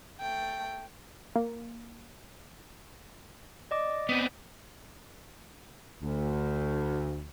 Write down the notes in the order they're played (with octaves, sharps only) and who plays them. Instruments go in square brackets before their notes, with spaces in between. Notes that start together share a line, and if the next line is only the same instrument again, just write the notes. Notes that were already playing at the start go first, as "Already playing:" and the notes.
[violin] A3 G5
[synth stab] A#3
[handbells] D5 D#5 D6
[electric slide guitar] B3 C4
[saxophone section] D2